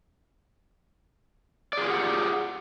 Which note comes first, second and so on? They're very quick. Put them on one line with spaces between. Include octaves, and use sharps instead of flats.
D5 G#4 F4 G4 F#5